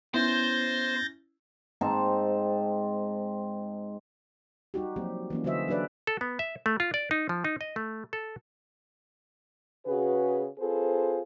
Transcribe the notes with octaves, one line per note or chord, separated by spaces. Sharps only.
B3 C#4 E4 C5 G6 A6 A#6
G#2 C4 D#4 A5
G3 D#4 F#4 G4
F3 F#3 A#3 C4 G4
E3 A#3 C#4
D3 F#3 F#4 C5 D#5 E5
F#3 D4 G#4 B4 D5 E5
A4
B3
E5
A3
F4
D5
D#4
F3
D#4
D#5
A3
A4
C#3 F#4 G#4 B4
C4 F4 G#4 A4 B4 C5